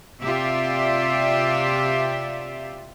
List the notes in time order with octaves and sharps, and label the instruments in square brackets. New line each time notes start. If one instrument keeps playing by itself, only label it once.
[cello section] C3 F4 G4 D5 E5